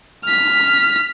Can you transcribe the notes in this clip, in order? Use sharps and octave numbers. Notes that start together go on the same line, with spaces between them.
F6 B6